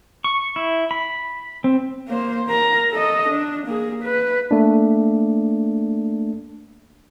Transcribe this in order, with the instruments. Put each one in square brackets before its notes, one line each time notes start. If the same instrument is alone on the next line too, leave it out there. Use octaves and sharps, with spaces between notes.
[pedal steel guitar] C#6
E4
B5
C4
[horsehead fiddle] A#3 C5
A#4 A#5
A4 D#5
D4
A#3 G#4
B4
[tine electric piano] A3 A#3 D4